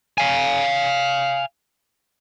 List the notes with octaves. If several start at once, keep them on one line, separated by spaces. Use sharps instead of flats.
F5 G#5